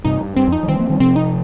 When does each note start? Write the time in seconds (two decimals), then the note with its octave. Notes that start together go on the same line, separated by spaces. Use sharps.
0.05 G2 C3 D#4
0.21 G2
0.36 G2 C4
0.48 F2
0.52 D#4
0.63 F3
0.68 D#3 G3 C4
0.79 F3 A#3
0.89 D#3 G3
1.00 C3 F3 C4
1.16 D#4